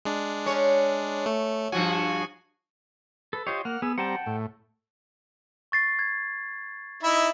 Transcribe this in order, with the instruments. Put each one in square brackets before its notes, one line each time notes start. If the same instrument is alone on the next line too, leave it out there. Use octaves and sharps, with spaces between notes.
[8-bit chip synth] G#3 D4
[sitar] C#4 C#5
[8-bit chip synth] A3
[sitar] G2 F3 F#4 [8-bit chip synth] G#5
[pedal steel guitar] A4 [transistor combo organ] B4
[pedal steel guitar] F4 C5 C#5 [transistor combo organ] G4 D#5
[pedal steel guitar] A#3 [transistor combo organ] F#5 F6
[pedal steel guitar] B3 [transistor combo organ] G#4 E6
[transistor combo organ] G3 C4 A#5 [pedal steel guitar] F#5 G5 A5
[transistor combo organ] A2
[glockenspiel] C#6 A6 C7
G#6
[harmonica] D#4 E4 E5